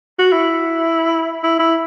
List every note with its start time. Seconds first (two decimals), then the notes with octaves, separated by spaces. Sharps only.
0.19 F#4
0.32 E4
1.43 E4
1.59 E4